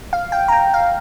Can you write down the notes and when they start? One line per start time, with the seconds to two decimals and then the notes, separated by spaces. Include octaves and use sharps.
0.13 F5
0.32 G5
0.48 A#5
0.53 G5
0.74 F5